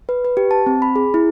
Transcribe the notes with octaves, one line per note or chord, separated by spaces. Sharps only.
B4
B4
G4
A5
C4
B5
G#4
E4